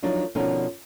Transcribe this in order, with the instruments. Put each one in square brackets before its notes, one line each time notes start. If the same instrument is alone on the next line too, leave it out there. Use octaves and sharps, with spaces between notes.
[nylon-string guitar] F3 F#3 D4 D#4 A#4 D5
B2 D3 F3 C#4 D#4 A#4